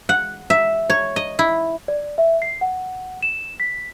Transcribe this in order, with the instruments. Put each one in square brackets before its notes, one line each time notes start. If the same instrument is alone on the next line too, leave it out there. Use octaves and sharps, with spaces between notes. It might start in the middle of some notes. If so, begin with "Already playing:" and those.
[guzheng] F#5
E5
C#5
D#5
E4
[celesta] D5
E5
C7
F#5
E7
B6